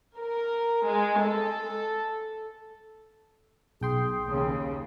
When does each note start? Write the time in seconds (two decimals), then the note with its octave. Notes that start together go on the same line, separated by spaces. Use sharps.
0.18 A#4
0.87 G#3
1.20 A4
3.81 B1 G#4 G5 C6
4.27 D#2 C#3